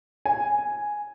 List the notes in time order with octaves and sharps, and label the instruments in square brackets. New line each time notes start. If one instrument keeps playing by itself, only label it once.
[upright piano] G#5